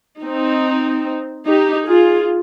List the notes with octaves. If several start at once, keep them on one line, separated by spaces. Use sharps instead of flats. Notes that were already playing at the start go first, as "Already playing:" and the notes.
C4 D#4
D#4 G4
F4 G#4